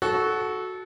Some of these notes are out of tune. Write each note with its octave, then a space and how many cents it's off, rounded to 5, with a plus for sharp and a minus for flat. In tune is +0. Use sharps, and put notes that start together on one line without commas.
F#4 +0 A4 -20